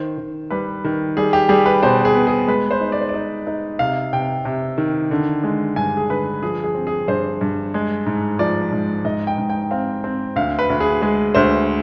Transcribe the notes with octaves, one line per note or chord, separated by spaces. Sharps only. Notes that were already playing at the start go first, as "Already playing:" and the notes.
Already playing: D#3 C5
D#3
G3 B4
D#3
G3 G#4
G4
G3 G#4
B4
B2 C5
G#4
B3
G#4
G#3 B4
C5
D#4
D5
C5
D5
D#4
D#4
C3 F5
C3 G5
C3
D#3
D3
G#3
G2 G#5
G#4
D3 B4
F3 G#4
G#4
C4
G#4
G2 C5
G2
G#3
G#2
F3 D5
G#2
G#2 D#5
G5
G#2
G5
C4 F5
C4
D2 F5
B4
D2
G#4
G#3 G#4
D2 C5